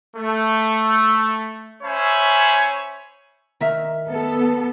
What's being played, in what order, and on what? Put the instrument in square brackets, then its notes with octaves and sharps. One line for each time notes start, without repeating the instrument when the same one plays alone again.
[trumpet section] A3
C#4 C5 C#5 E5 G#5 B5
[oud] D#3 A#4 E5
[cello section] B3 A4